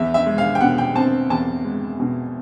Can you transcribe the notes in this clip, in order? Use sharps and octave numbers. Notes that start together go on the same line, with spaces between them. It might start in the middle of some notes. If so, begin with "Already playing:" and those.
Already playing: E2 E5
E5
G#3
F5
G5
B2 F#5
G5
C4 A5
E2 A5
G#3
B2